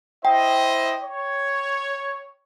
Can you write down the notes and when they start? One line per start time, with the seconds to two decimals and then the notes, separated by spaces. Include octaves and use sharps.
0.25 E4 C5 D#5 G5
1.02 C#5